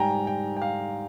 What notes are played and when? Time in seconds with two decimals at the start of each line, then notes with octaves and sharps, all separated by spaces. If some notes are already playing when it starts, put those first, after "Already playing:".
Already playing: G#2 G3 G5 G#5 A#5
0.27 G5
0.57 G5
0.62 F5